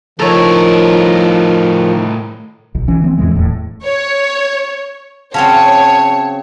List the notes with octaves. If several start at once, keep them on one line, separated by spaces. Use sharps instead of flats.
A2 D#3 F3 A4 A#4 C#5
B1
E3 C#4
E3 A#3 C4
F2 A2 E3 G#3
D1 E2 A2
C#5
C#3 F#3 C4 C#5 A5